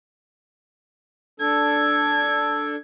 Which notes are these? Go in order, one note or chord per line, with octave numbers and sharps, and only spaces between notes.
D4 A4 G#6